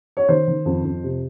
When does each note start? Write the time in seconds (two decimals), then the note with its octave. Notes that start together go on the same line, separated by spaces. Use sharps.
0.17 C#5
0.29 D#3 C5
0.48 D#3
0.65 F2
0.84 F2
1.03 C3